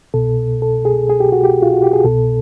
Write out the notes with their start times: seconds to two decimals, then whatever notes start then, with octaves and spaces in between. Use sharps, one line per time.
0.14 C2 B2 A4
0.62 A4
0.85 G#4
1.10 G#4
1.20 G4
1.32 F#4
1.43 G4
1.62 F4
1.73 F#4
1.83 G4
1.93 G#4
2.05 C2 B2 A4